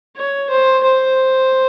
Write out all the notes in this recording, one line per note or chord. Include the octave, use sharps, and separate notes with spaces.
C#5
C5
C5